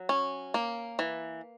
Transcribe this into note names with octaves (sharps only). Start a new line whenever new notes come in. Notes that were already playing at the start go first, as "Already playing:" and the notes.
Already playing: F#3
C#4
A#3
E3